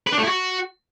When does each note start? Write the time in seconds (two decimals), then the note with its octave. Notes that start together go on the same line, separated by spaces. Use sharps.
0.07 B4
0.12 D4
0.18 A3
0.23 E4
0.28 F#4